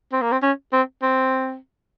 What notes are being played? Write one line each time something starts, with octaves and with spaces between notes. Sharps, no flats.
C4
A#3
C4
C#4
C4
C4